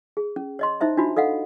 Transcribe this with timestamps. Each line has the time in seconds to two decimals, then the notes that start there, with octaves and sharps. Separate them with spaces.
0.17 G#4
0.36 C#4
0.59 C#5 D#5 C6
0.81 D#4 C5 E5 A#5
0.97 D4 D#4 F4 F#4 B5
1.17 A4 D#5 F5 F#5